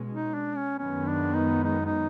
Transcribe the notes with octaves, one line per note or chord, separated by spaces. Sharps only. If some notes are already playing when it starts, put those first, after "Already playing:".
Already playing: B2 G#3 C#4
D#4
D4
C#4
F#2 D#3 G#3 B3 C#4
D4
D#4
D#4
D#4